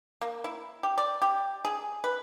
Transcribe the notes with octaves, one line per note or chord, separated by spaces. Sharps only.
A#3
E4
G4
D5
G4
G#4
B4